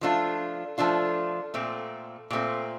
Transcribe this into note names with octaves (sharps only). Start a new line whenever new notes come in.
F3 A3 D4 F4
F3 A3 D4 F4
A#2 A3 C4
A#2 A3 C4